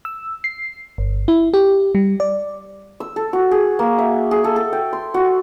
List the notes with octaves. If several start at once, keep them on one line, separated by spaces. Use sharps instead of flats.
E6
C7
G1
E4
G4
G3
D5
E6
A4
F#4
G#4
A#3
E5
G#4
A4
A4
G5
C6
F#4